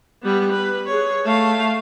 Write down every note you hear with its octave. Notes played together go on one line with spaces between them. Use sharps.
G3 B3
B4
G#4 C#5
A3 F5